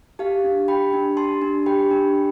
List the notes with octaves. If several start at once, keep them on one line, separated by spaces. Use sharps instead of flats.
G4 F5 A5
D4
G4 G5 B5
D4
G4 A5 C6
D4
G4 G5 B5
D4
G4